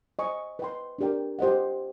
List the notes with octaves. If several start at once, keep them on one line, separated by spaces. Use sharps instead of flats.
C5 D#5 G#5 C#6
B4 D#5 G5 C6
D4 G4 A#4 D5 G5
G4 C5 D#5 F#5